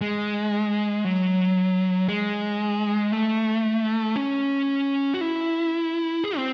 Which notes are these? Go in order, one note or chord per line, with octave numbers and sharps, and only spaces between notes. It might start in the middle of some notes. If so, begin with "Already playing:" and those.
G#3
F#3
G#3
A3
C#4
F#4
E4
G#4
C4